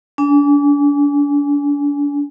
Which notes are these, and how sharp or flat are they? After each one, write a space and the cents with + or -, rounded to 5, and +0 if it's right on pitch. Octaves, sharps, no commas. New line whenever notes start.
D4 -35 G#5 +0